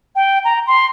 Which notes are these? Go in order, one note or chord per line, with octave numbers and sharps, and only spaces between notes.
G5
A#5
C6